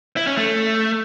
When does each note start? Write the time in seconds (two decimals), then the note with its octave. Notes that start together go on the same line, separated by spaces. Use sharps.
0.17 E4
0.27 C#4
0.37 A3